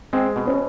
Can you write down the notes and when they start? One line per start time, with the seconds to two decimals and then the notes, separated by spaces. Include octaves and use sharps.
0.13 G#3 C4
0.36 B2
0.47 C#4